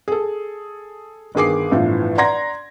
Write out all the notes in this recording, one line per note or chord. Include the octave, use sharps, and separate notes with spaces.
G#4 A4
G1 D#3 G#4 D6 C7
G1 A2 E3 F3
D5 F#5 A#5 C6 G#6 A#6